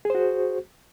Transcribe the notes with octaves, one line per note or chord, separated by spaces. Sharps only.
F#4 G#4 C5